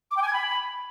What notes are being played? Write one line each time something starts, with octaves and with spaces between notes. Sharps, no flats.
D6
G5
G#5
G#6
B5